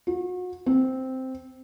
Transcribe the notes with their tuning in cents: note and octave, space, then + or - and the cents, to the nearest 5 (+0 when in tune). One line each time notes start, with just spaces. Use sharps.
F#4 -35
C4 -5